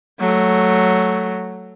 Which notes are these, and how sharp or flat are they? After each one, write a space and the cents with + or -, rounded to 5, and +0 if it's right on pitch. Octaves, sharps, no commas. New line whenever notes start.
F#3 +0 A3 +0